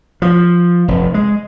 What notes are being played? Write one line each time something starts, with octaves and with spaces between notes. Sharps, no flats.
F3
F1
G#3